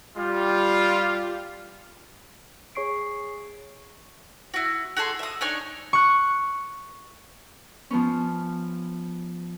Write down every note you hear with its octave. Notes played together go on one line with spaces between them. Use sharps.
G3 F4
G#4 C#5 C#6 C7 D7
E4 F#4
F#4 G#4 A4 C6
E5 D#6
D4 D#4 C#5 G#5
C#6 F#6
F3 B3 C#4